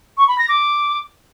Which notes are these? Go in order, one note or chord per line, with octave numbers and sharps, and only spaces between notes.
C#6
B5
A#6
D6